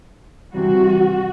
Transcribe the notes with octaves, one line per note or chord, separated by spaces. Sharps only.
C3 E3 G3 F#4